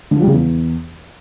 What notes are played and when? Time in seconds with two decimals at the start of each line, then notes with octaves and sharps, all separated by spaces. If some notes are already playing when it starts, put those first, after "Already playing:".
0.11 D3
0.16 F3
0.22 G3
0.27 C#3
0.32 E2